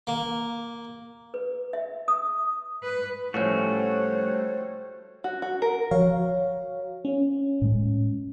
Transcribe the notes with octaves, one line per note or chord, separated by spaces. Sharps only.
A#3
B4
E5
D#6
B4
A2 F3 G3 A3 C#4 F#4 C5 C#5
F#4
F#4
A#4
F3 F#4 C#5 F5
C#4
A2 G#3